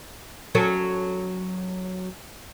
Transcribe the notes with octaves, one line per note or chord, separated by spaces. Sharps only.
F#3 C#4 A4